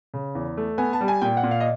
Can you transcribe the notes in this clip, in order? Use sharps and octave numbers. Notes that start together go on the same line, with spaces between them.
C#3
E2
A3
B3 G#5
A5
G3
G#5
A#2 G5
F#5
A#2
F5
D#5